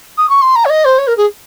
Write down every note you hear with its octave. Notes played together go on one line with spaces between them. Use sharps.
D#6
C#6
C6
A#5
C#5
D#5
C5
C#5
A#4
G#4